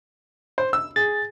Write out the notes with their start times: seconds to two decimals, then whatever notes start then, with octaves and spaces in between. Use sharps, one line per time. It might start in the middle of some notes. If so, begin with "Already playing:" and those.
0.58 C5
0.73 E6
0.96 G#4 A6